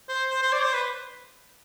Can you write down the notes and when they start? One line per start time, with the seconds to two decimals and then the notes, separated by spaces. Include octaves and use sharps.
0.08 C5
0.30 C5
0.42 C5
0.53 D5
0.63 C5
0.73 B4